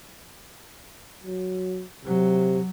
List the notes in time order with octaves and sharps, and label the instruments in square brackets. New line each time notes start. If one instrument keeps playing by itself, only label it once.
[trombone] F#3
[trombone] C3 [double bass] F#3